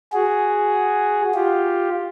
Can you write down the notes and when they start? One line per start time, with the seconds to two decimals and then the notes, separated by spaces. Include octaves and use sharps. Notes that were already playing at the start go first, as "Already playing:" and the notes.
0.13 F#4 G#4
1.34 F4 G4